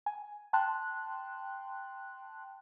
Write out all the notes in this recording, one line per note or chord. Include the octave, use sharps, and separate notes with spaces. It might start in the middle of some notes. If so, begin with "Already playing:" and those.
G#5
G5 A5 C6 F#6